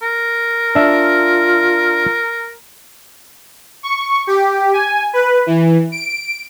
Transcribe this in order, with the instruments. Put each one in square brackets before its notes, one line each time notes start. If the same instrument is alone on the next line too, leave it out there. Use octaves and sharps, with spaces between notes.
[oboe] A#4
[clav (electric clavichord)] D4 E5 [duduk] F4
[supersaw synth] C#6
G4
G#5
B4
E3
D7